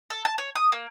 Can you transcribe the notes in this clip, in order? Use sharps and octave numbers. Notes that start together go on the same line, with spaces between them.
A4
A5
C#5
D#6
A#3